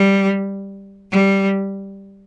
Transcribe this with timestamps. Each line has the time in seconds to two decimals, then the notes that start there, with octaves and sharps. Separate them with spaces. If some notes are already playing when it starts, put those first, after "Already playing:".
Already playing: G3
1.10 G3